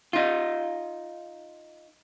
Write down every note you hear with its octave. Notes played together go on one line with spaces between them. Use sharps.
D#4 F4